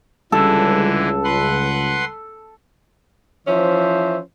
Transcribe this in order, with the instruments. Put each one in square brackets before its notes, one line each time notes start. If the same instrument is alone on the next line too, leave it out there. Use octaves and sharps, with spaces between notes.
[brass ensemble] C#2 [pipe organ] D3 E3 E4 [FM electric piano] G3 [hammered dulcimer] A4
[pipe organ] B4 F#5 C6
[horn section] E3 F3 C#4 C5 E5